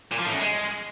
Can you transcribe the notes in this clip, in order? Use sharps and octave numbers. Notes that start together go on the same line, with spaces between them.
A#2
F3
A2
F#2
G#3